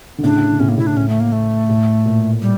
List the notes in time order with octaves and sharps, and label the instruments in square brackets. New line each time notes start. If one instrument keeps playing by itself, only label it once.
[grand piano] D3
[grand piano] A2 C#3 [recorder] D4
[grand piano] D3
[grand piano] A2 C#3 [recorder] C#4
[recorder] A#3
[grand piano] A2 [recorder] E4
[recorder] D4
[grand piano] A2 [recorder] C#4
[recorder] A3
A#3
A3
[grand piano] A2
A#2
[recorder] G3